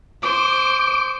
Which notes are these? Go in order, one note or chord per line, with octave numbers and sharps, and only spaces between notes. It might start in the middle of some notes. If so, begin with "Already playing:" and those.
C5 D6